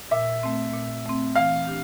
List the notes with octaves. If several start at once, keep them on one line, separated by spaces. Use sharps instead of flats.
A#2 E5
A3 C4
A#2
A3 C4
E3 F5
D4 G4